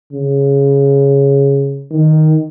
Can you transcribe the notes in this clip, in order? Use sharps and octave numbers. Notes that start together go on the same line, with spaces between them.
C#3
D#3